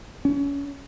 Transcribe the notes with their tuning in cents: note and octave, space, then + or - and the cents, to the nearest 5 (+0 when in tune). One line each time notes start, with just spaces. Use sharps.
C#4 +30